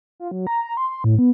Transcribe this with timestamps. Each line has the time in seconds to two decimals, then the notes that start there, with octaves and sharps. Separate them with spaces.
0.20 F4
0.31 F#3
0.47 A#5
0.64 A#5
0.77 C6
0.90 C6
1.04 A2
1.19 B3